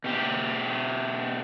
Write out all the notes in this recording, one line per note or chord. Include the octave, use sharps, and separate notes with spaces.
B2 G4